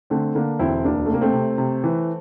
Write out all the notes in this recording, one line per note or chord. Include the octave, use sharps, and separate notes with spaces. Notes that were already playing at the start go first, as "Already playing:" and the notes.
D3 A3 C4
D3 A#3 D4
E1 C4 E4
D2 A#3 D4
A3
C3 A#3
A3 C4
C3
C3
E3